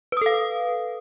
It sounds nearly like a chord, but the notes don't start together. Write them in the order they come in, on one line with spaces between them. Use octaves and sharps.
B4 D#6 A4 F5